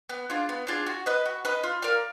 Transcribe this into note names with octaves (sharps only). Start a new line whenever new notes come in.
B3
D4 F4 G#4
B3
D4 F4 G#4
F#4
B4 D#5
F#4
B4 D#5
F4
A#4 D5 F5